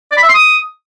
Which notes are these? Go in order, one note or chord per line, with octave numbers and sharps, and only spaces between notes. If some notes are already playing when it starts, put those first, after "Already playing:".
D5
B5
E5
C6
D#6